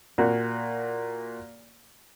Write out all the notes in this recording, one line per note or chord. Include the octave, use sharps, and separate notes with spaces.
A#2 F#4